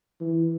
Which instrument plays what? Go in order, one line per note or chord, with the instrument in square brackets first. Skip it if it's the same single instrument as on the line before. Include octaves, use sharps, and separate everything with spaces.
[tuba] E3